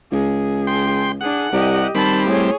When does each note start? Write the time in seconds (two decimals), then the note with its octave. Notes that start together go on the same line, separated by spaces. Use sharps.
0.12 C#2 G#4
0.67 G5 C6
1.21 D4 G#4 F#5
1.53 C2 G4 D#5
1.95 D#3 G3 C4 A5 B5
2.26 A2 G#4 C#5